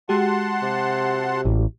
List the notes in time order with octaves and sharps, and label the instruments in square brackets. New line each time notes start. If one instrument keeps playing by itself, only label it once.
[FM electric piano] G#3 F#4 G4 [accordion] F#5 A5 C6
[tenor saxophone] C3
[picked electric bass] A1